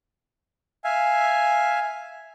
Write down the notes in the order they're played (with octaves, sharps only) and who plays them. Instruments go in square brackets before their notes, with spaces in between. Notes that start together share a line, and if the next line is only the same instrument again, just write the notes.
[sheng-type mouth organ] E5 F5 G#5